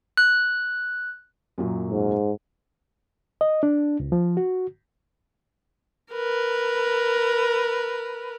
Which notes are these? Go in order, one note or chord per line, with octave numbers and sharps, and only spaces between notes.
F#6
F#2 A#2 F#3
G#2
D#5
D4
C#2
F3
F#4
A#4 B4